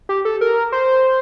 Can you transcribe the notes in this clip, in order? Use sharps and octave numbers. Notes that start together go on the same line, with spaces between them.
G4
A4
A#4
C5